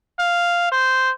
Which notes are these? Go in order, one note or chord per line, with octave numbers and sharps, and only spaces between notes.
F5
C5